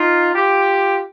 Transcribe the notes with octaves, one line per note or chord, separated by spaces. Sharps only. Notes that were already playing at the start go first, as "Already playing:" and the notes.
Already playing: D#4 F4
F4 G4